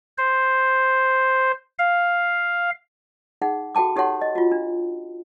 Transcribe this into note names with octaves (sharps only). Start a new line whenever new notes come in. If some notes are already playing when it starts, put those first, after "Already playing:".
C5
F5
D#4 G#4 F#5
F#4 A4 G5 A5 D6
D#4 G4 A4 C#5 F#5 C6
D#5
F4 F#4
D4